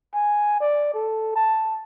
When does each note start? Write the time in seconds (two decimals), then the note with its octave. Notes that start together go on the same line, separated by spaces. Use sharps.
0.14 G#5
0.61 D5
0.94 A4
1.36 A5